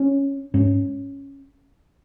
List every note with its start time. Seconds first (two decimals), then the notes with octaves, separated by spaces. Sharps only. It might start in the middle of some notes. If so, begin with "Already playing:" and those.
Already playing: C#4
0.54 G#2 C#4